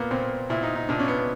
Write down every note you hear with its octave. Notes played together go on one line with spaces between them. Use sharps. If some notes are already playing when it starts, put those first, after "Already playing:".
Already playing: A#2 A#3 B3
A#2 C4
A#2 E4
D#4
D#4
A#2 D4
C#4
B3
B3